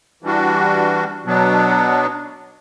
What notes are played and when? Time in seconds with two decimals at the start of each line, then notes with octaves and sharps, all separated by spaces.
0.23 E3 G3 D4 F#4
1.25 B2 F#3 B3 D4